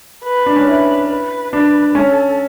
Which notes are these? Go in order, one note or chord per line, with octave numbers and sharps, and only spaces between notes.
B4
D4
C#4
E4 B4
B4
D4
C#4 A4